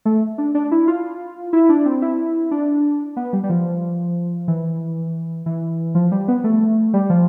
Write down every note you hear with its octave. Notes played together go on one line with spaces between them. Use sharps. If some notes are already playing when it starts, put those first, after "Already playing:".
A3
D4
D4
E4
F4
E4
D4
C4
E4
D4
B3
G3
G3
F3
E3
E3
F3
G3
B3
A3
G3
F3